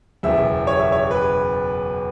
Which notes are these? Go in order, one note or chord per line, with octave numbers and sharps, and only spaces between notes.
F#1 E2 B2 E5
C#5
E5
C#5
B4